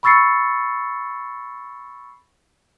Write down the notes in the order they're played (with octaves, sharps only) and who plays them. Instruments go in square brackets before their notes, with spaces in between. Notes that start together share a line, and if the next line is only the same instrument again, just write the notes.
[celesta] B5 C#6 E6 A6 C7 C#7